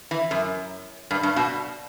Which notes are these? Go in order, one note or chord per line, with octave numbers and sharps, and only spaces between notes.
E3
F#2
G2
G2
B2